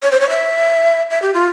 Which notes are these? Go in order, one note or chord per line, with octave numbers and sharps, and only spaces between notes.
C#5
C5
C#5
E5
E5
G4
F4